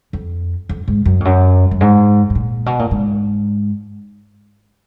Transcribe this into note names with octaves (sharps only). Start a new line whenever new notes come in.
F2
F2
G#2
F#2
F2
F#2
F#2
G#2
G#2
A#2
B2
A#2
G#2